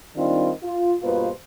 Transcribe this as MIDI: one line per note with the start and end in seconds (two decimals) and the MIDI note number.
0.16 0.50 51
0.16 0.50 55
0.16 0.50 60
0.16 0.50 62
0.16 0.50 63
0.16 0.50 65
0.63 0.93 65
1.02 1.29 43
1.02 1.29 47
1.02 1.29 58
1.02 1.29 65
1.02 1.29 71
1.02 1.29 72